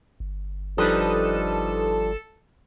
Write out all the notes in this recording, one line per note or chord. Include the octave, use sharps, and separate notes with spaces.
G1
F3 G3 D4 D#4 A4 B4 D#6